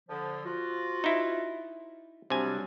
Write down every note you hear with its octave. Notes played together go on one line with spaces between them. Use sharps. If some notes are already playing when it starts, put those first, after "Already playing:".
D3 F3
F3 F4 F#4
D#4 E4
C3 F#3 G3 D4 G#5